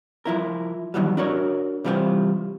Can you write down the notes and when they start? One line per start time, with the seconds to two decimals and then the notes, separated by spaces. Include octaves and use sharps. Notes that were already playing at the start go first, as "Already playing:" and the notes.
0.25 F3 E4 A#4
0.94 F2 D#3 E3 F#3 G3
1.17 D4 F#4 A#4 C#5
1.85 C3 E3 G3 F4 F#4 C5